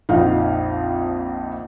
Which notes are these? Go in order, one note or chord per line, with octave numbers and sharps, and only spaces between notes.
A#1 F2 D#4 F4 F5 F#5